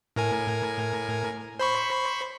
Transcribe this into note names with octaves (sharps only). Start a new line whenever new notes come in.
A2 A#4 G#5
C5 B5 C#6